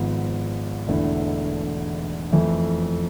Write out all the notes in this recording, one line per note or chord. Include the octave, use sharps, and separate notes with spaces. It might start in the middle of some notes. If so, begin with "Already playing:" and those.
Already playing: G#1 G#2 F3 B3
E1 E2 D3 A3 E4
F2 E3 A3 E4